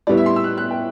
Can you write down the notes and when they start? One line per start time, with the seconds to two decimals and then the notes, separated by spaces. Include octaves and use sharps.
0.07 A2 G3 B3 E4 D5
0.17 E5
0.26 C6
0.36 E6
0.44 F#6
0.58 F#6
0.70 G5